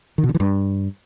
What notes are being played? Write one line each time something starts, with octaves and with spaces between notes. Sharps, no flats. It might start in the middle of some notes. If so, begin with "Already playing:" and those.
D#3
B2
D3
E3
G2